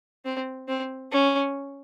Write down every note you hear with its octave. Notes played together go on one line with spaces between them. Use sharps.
C4
C4
C#4